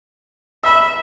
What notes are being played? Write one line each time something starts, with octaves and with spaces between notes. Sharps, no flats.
E5 B5 E6